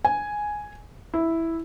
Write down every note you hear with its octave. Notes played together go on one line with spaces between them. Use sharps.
G#5
E4